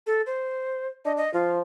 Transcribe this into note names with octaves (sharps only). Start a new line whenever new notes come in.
A4
C5
D4 D#5
D#5
F3 F4